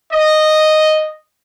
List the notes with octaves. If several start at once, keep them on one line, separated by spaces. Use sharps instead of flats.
D#5